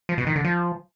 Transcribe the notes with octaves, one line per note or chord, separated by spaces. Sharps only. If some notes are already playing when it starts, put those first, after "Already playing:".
F3
B2
D#3
D3
F3